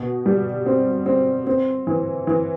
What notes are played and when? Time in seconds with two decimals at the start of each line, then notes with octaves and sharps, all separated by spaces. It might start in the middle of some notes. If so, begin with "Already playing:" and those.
Already playing: B2
0.26 G3
0.66 C4
1.06 C4
1.47 C4
1.87 E3
2.27 E3